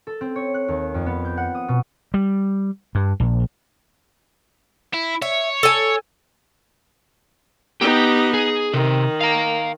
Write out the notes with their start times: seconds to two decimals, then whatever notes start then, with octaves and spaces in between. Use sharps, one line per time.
0.07 A4
0.21 C4
0.36 C#5
0.54 F#6
0.68 D#2
0.94 F2
1.06 B3
1.25 G6
1.37 F#5
1.55 D#6
1.68 B2
2.14 G3
2.95 G2
3.20 A#1
4.94 E4
5.22 C#5 E5
5.63 A4 G#5
7.81 B3 D#4 G4
8.34 G#4
8.74 C3 D#3
9.21 F5 A#5